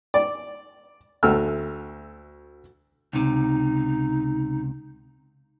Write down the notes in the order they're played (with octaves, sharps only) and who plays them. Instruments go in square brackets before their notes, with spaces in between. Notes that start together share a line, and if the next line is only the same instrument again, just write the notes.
[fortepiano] D5
D2 A3 E6 F6
[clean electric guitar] C#2 C3 [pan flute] D#4